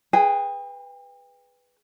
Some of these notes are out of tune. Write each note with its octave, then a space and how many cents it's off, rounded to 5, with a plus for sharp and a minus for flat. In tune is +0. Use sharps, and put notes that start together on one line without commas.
G#4 +0 B4 +0 G5 +35